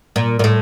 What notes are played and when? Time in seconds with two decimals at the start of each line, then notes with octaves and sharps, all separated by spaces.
0.16 A#2
0.39 A#2
0.44 A2